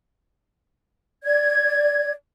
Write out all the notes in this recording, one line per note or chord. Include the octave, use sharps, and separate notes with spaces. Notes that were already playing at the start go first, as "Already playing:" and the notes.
D5 G#6